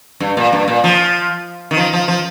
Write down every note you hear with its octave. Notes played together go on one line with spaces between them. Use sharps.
G2
A#2
G2
A#2
F3
D#3
F3
F3
F3